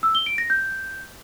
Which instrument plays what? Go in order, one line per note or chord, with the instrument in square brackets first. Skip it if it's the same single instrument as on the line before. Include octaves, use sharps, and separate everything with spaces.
[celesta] E6
G7
D7
A#6
G6